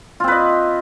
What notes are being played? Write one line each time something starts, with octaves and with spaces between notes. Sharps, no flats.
C4 F4 B4 D#5